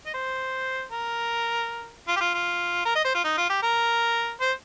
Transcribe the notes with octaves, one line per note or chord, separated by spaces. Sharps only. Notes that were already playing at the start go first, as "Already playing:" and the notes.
D#5
C5
A#4
F4
G4
F4
F4
A#4
D#5
C5
F4
D#4
F4
G4
A#4
C5